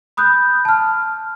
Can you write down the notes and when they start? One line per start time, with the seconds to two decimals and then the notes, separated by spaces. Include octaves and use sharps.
0.17 B5 D#6 F#6 G6
0.65 A5 F6